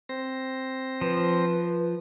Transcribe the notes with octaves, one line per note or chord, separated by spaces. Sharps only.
C4 C5 A#6
F3 B4